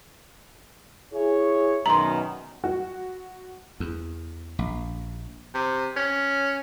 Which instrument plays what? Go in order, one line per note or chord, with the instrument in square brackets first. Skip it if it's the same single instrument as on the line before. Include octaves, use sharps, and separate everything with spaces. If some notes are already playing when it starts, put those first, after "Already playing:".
[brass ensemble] E4 G#4 C#5
[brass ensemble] F#2 B2 D#3 [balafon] A#5 C6
[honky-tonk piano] F#4
[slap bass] E2
A#1
[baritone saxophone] C3
C#4